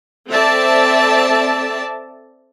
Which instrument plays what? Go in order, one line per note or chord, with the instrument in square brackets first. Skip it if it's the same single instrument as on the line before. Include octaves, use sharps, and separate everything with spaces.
[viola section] C4 A4 D5 E5 A5